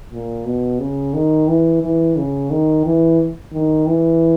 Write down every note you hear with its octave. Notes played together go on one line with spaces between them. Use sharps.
A#2
B2
C#3
D#3
E3
E3
C#3
D#3
E3
D#3
E3